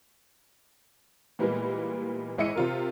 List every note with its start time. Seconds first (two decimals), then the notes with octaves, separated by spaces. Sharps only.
1.39 A#2 E3 G3 G#3 A#3 B3
2.38 G#1 G#3 E4 D#5 C#7 D#7
2.55 C3 F4 A#4